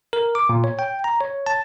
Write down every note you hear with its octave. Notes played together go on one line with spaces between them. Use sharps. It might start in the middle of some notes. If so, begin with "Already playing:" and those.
A#4
D6
A#2
C#5
G5
A#5
C#5
A5